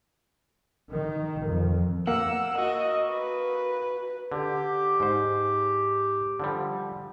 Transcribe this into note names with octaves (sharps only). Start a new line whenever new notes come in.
D#3
F2
A#3 F#5 E6
F#4 D#5
B4
D3 G4
G#2 C5
D3 F3 G3